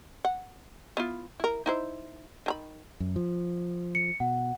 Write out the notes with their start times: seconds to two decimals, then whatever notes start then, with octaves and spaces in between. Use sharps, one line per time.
0.25 F#5
0.97 B3 E4 F4
1.40 E4 A#4
1.66 D#4 E4 C5
2.46 D#3 A#5 B5
3.00 F#2
3.16 F3
3.95 C#7
4.20 B2 F#5